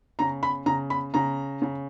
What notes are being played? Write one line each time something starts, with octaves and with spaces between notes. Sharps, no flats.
C#3 A#5
B5
C#3 A#5
B5
C#3 A#5
C#3